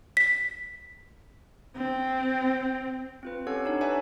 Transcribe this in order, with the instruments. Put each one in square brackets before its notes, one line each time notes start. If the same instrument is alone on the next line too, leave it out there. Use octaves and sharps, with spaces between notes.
[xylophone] B6
[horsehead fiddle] C4
[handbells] C4 F4 B4
C#4 G4 A4 C#5 F#5
D4 D#4 C#5
B4 C#5 D5 E5 G#5